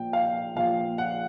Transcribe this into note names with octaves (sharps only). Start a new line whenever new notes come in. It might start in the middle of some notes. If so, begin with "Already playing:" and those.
Already playing: A#1 A#2 F3 G5
F5
A#1 A#2 F3 F5
F#5